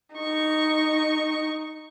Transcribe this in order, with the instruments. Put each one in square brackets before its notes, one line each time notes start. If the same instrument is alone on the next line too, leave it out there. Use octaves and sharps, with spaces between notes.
[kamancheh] D#4 C#6